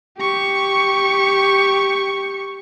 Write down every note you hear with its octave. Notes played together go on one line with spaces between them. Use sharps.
G4 C#6